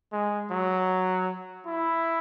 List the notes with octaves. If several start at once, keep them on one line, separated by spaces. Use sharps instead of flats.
G#3
F#3
E4